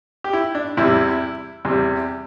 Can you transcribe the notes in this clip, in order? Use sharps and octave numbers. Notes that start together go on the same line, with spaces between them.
G4
E4
D4
E2 C3 G3 E4
E2 C3 G3